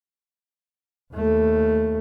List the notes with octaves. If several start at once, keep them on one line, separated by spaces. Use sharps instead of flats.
D#2 A3